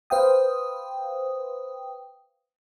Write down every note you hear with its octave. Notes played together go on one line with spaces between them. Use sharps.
B4 C5 F5 G5 D#6